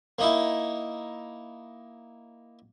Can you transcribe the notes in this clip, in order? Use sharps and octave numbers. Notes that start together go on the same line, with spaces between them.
A#3 D#4 E4